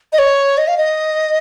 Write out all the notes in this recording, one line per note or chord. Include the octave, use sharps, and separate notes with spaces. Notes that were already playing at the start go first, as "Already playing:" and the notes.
D#5
C#5
D#5
F5
D#5